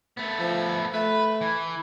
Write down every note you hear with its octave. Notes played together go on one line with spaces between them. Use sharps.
A3 B3
F3
A3 B4
E3